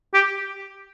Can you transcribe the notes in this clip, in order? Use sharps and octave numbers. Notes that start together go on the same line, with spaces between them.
G4